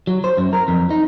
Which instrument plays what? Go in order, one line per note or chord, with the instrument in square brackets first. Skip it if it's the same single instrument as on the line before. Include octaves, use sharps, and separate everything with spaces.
[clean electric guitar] F#3
C5
F#2
A#4
F2
D#4